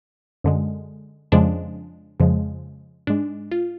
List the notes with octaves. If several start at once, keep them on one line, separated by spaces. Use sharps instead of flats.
F#2 D3 G#3
F2 C#3 F3 G#3 D4
F2 C#3 F3 G#3
G#2 G#3 D4
F4